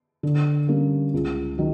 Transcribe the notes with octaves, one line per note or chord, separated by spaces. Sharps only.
D3
G3 A#3 C#4
C#2
D#3 F#3